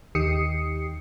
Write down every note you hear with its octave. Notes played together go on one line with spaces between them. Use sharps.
D#2 D#3 G4 D#6 C7 C#7